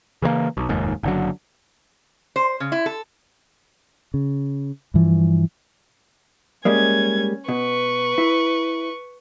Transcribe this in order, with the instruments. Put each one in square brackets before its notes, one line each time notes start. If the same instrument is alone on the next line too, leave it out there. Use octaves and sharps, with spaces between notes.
[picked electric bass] C#3 E3 G3 A#3
B1
F1 D#2 G#2
F#1 D3 F#3
[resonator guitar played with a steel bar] C5
C#3
E4
A4
[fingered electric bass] C#3
G2 E3 F3
[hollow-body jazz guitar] G3 G#3 A#3 [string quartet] C#4 G#6
[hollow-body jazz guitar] B2 [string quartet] B4 C#6
[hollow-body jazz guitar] E4